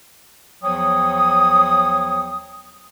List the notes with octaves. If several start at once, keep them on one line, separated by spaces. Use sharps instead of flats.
E2 F3 F#3 C#5 G5 D#6